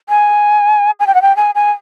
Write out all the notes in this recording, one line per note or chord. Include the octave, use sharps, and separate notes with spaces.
G#5
G#5
G5
F#5
G5
G#5
G#5